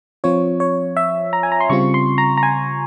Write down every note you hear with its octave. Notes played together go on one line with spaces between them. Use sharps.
F3 C4 F4 C#5
C#5
E5
A#5
G#5
A#5
C6
C#3 G3 C4 F4 C#6
C6
A#5
A#5
G#5